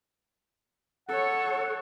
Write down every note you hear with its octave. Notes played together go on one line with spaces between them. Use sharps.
A4 C#5 F#5